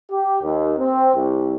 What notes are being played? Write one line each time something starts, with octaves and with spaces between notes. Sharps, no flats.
G4
D#2
C4
C2